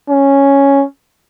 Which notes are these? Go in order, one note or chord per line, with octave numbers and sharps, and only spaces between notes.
C#4